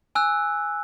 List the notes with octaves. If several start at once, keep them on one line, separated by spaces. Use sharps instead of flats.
G#5 E6 F#6